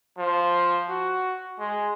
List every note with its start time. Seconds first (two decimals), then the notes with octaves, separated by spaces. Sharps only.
0.18 F3
0.89 F#4
1.59 G#3